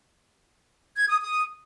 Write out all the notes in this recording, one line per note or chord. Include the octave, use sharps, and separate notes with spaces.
G#6
D#6
D#6